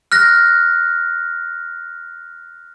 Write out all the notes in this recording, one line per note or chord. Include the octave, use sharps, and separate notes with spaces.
F6 F#6 A#6